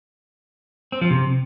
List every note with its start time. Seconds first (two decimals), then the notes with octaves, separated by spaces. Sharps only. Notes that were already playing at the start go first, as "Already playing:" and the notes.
0.92 C4
1.01 F3
1.11 C3